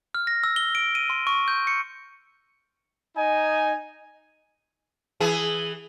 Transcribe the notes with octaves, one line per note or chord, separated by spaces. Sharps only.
F6
A#6
E6
G7
D7
D#7
C6
C#6
G6
C#7
D#4 D#5 G#5
E3 G#4